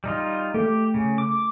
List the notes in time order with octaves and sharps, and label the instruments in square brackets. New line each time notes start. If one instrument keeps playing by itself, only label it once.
[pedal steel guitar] G3 D#4 F4
[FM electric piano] A3 [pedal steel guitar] G4
[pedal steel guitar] C#3
D6